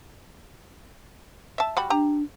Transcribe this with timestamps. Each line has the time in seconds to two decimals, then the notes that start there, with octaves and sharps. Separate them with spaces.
1.58 E5 A5
1.77 G3 F#4 B5
1.90 D4 G4 A#5